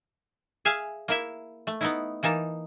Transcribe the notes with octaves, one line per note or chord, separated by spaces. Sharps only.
G#4 E5 F5 G#5
A#3 E4 E5
A3
B3 D#4 E4
E3 A#3 D#4 A5